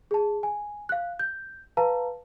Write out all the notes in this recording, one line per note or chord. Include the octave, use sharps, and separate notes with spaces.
G#4 A5
G#5
F5 F#6
G6
B4 F5 A5 A#5